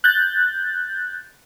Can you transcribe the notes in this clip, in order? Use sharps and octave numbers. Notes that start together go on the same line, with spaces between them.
F#6 G6 A6